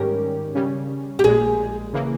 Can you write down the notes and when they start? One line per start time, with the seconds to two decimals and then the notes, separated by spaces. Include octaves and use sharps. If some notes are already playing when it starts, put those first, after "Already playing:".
Already playing: G#2 D#3 G3 C#4 G4 A#4
0.55 C#3 G3 C#4
1.19 G4
1.24 A#1 A#2 G#3 G#4
1.93 C#3 E3 A#3